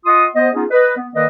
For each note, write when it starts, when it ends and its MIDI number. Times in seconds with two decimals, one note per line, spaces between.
0.06 0.26 65
0.06 0.26 75
0.06 0.26 78
0.06 0.26 84
0.06 0.26 87
0.36 0.48 59
0.36 0.48 72
0.36 0.48 75
0.53 0.65 59
0.53 0.65 61
0.53 0.65 63
0.53 0.65 65
0.53 0.65 68
0.70 0.95 71
0.70 0.95 75
0.97 1.08 59
1.14 1.27 51
1.14 1.27 58
1.14 1.27 70
1.14 1.27 71
1.14 1.27 74
1.14 1.27 75